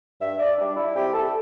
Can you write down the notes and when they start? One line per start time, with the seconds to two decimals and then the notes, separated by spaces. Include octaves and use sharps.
0.21 G2 E5
0.39 D5
0.57 G3 D4
0.76 E4
0.95 C3 G4
1.13 A4